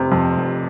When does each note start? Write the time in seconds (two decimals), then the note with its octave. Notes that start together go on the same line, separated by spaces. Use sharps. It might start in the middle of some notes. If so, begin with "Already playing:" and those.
Already playing: F1 C3
0.12 F2
0.37 F1